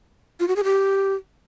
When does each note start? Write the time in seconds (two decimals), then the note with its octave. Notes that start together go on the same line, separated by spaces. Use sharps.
0.40 F4
0.48 F#4
0.56 G#4
0.64 G4